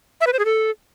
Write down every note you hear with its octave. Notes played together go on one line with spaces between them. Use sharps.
E5
B4
C5
G#4
A4